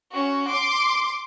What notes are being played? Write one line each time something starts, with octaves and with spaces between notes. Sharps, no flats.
C#4 F#4
C6 D6